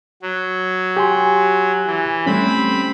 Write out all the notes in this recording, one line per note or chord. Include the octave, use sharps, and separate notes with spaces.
F#3
G4 G#5 C6
E3
G3 A3 C4 C#4 B5